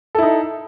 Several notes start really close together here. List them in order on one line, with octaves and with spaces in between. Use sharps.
A4 E4 D#4